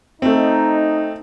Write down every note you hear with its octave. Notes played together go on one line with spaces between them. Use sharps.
A3 C4 D#4